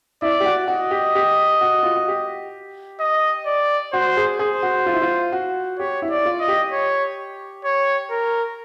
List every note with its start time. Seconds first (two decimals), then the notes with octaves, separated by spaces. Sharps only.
0.22 E4 D5
0.40 G4
0.45 F#4
0.68 F#4 D#5
0.91 G4
1.15 G4
1.61 F#4
1.83 F4
1.96 F#4
2.08 G4
3.00 D#5
3.46 D5
3.93 F#4 C5
4.17 G#4
4.39 G#4 C5
4.63 F#4
4.86 F4
4.94 E4
5.02 F4
5.32 F#4
5.79 G4 C#5
6.02 E4
6.10 D5
6.25 F4
6.40 D#5
6.48 G4
6.72 C#5
7.65 C#5
8.11 A#4